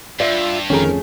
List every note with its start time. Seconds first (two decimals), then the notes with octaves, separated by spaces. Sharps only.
0.20 G2 F4 D5 E5
0.70 G1 F2 D#3 A3 C#4 G#4 A#4